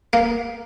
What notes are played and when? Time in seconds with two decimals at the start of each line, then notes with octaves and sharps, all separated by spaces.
0.13 A#3